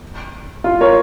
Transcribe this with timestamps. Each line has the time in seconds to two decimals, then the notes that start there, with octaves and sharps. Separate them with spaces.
0.64 F4
0.80 A#4 C#5